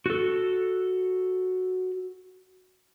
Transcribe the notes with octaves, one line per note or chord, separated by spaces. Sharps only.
F#4 A4